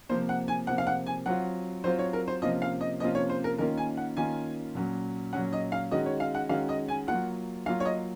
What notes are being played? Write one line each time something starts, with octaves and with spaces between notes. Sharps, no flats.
C3 F3 A#3 C5
F#5
G#5
C3 F3 A#3 F#5
F5
F#5
G#5
F#3 C4 F4 F#5
F#3 C4 F4 C5
C#5
A#4
C5
C3 F3 A#3 C#4 F4 D#5
F5
D#5
C3 F3 A#3 C#4 F4 D#5
C#5
C5
A#4
D#3 A#3 C#4 F4 A#4
G#5
F#5
D#3 A#3 C#4 F4 G#5
A#2 F#3 C#4
A#2 F#3 C#4 F#5
D#5
F5
D#3 G#3 C#4 F#4 D#5
C#5
F5
F#5
D#3 G#3 C#4 F#4 F5
D#5
G#5
F#3 A#3 F4 F#5
F#3 A#3 F4 F5
C#5
D#5